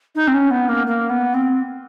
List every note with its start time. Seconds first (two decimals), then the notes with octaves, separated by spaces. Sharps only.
0.15 D#4
0.28 C4
0.34 C#4
0.51 B3
0.69 A#3
0.87 A#3
1.10 B3
1.34 C4